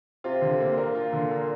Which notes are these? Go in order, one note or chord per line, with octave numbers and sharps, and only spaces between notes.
C3 F4
D3
A#3
A#2 A#4
F4
D3
A#4